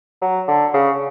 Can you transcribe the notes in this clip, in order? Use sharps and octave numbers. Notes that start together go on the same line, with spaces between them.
F#3
D3
C#3